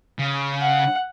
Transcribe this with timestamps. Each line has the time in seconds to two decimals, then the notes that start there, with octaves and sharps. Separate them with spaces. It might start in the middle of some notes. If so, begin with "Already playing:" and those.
0.19 C#3
0.61 F#5